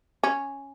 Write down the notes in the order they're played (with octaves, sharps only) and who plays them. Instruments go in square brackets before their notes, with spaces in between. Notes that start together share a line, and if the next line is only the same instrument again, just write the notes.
[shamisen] C#4